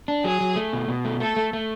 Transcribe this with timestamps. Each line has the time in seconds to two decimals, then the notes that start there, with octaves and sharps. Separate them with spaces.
0.08 D4
0.24 F#3 G#4
0.41 F#3
0.56 A3
0.73 B2
0.88 B2
1.05 A3
1.20 A3 A4
1.36 A3
1.53 A3